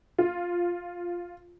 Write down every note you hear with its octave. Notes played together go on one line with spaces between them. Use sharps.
F4